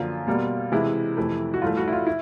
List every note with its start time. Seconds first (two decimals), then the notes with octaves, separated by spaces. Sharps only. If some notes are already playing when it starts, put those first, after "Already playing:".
Already playing: F#2 D3 F3 A#3 F4
0.27 B2 G3 A#3
0.72 C3 E3 G#3 E4
1.17 F2 C3 E3 A3
1.54 F#4
1.62 G2 E3 A3 F4
1.77 F#4
1.88 E4
1.93 F4
2.07 E4